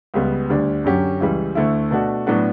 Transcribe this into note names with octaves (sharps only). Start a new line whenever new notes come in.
C#2 C#3 G3 B3
D2 D3 G3 D4
F#2 D3 F#3 C#4 G4
C#2 C#3 E3 G3
D2 D3 A3 E4
B2 A3 D4 F#4
A2 F#3 B3 D4 F#4